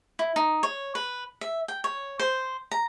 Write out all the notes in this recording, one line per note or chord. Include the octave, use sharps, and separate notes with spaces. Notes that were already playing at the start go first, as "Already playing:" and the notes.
E4
D#4
C#5
B4
E5
G5
C#5
C5
A#5